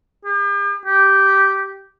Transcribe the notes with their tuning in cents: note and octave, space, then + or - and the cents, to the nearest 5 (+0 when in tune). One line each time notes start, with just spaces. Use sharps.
G4 +40
G4 -10